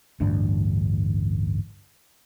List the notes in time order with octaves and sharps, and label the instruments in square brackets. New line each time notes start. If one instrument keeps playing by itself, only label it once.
[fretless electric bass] A1 D2 G2 D4